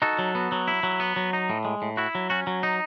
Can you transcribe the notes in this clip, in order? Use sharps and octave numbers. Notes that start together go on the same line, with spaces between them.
D#4 F#4 A4
F#3
B3
F#3
E4
F#3
B3
F#3
D#4
A2
G#3
A2
E4 F#4
F#3
C#4 F#4
F#3
D#4